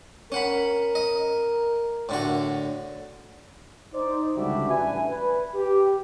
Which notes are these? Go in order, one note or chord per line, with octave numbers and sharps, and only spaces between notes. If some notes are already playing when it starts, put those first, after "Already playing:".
C#4 A#4 F#5 B5
D#5
A2 D3 F#4
D#4 C5 D5
C#2 D3 G3 F#4 D5 E5
A1 D4 B4 E5 G#5
B4
G4